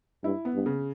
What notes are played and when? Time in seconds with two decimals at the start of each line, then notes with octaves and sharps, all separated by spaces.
0.24 G2 E4
0.45 B3
0.55 G2
0.66 C#3